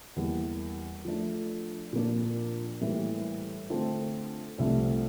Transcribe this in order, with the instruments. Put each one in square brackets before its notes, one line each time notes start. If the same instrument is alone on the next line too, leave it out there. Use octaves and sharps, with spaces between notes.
[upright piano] E2 E3 G3 A#3
F3 A3 D4
A#2 F3 A#3 D4
A2 E3 G3 A#3
D3 A3 C4 F4 A4
C2 C3 F3 A3 D4